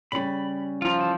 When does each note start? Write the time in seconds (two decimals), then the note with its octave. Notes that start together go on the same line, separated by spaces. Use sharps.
0.12 C#3 G3 B5
0.82 F3 F4 A#5
0.99 E3 A5